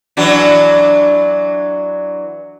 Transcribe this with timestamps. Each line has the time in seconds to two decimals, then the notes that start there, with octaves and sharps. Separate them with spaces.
0.17 E3 F#3 D4